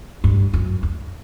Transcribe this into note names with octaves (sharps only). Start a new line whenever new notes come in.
G2
F#2
F2